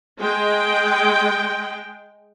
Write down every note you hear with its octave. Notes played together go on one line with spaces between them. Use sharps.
G#3 G5